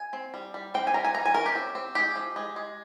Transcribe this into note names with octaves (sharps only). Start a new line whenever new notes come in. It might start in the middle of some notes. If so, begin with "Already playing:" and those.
Already playing: G#5
C4
G3
G3
C4 G5
G#5
G3 A#5
G#5
E3 A#5
G#5
C#4 A#4
G4
C4
C4
G#3 G4
F3
G#3
G#3